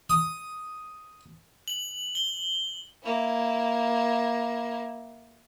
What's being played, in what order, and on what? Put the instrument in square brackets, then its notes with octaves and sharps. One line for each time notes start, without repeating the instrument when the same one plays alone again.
[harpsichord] D#6
[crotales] F#7
G7
[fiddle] A#3 E4